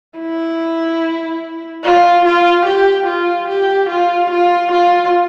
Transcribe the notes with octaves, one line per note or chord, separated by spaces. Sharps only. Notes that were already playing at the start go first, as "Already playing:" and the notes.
E4
F4
F4
G4
F4
G4
F4
F4
F4